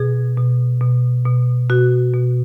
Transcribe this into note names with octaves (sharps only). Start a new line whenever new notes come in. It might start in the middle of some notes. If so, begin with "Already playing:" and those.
Already playing: B2 G#4
B2
B2
B2
B2 F#4
B2